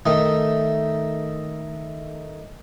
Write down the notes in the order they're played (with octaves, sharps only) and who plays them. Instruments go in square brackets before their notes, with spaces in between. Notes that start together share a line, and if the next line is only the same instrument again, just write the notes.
[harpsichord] D#3 A3 D#4